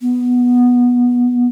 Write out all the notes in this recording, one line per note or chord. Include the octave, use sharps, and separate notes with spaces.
B3